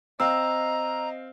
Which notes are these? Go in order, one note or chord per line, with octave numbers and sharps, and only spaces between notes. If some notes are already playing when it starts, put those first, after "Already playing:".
C4 D#5 F5 A#5 E6